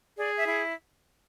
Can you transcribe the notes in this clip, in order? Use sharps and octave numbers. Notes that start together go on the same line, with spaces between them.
G#4 D5
E5
E4